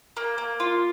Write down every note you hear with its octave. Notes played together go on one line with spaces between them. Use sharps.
A#3
A#3
F4